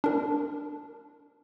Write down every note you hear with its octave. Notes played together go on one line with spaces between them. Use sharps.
D4 A#4